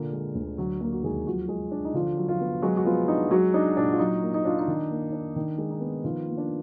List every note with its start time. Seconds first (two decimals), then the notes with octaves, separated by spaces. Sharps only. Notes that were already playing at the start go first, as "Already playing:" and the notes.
Already playing: A#2 D3 A#3 A#4
0.13 G#3
0.35 D2
0.58 D3 F#3 F#4
0.81 F#3 A#3 A#4
0.92 F#4
1.04 D#2 G#3 G#4
1.26 F3 F#3 F#4
1.49 G#3
1.71 D4
1.85 D#4
1.94 D3 F3 F4
2.17 F#3
2.29 F3 F4
2.41 B3
2.62 F#3 G#3 F#4
2.77 F#4
2.85 F3 B3 F4
3.08 D4 D#4
3.31 F#3 G#3 F#4
3.54 D4 D#4
3.77 A#2 D4
3.93 F4
3.99 F#3 D#4
4.22 A#3
4.34 D#4
4.45 D4 F4
4.59 D#4
4.68 D#3
4.91 A#3
5.12 D4
5.36 D#3
5.58 G#3
5.71 D#4
5.81 B3
6.03 D#3 F3 F4
6.27 A#3
6.38 D4